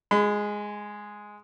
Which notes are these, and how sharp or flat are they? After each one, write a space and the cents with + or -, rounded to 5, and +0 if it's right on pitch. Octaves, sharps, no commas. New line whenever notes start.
G#3 +0 B5 +45